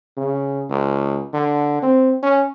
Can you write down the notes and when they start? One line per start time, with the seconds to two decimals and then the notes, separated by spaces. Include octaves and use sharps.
0.17 C#3
0.70 C#2
1.34 D3
1.82 C4
2.23 C#4